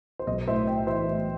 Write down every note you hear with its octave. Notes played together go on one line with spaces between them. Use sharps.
C5
B1 D#5
A2 C5 E5
A2 E5 G5
E3 C5 E5
A2